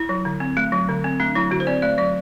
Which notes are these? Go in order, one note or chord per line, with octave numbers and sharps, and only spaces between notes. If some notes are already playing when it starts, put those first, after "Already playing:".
Already playing: E4
F#3
D3
C4
A3
F#3
D3
C4
A3 D4
F#3 E4
D3 F#4
C5
C4 D5
A3 D5
F#3 D5